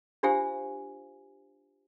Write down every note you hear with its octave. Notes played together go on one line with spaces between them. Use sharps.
D4 F4 G4 C5 F5 G#5